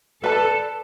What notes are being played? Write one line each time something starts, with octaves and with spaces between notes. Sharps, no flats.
A4 B4 D5 A5